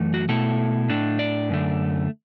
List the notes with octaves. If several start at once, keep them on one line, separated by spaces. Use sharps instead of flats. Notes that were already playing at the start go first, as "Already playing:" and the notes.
Already playing: F#2 E3 A3
F#4
B2 A3 E4 A4
A2 A3 D4
D5
F#2 D3 A3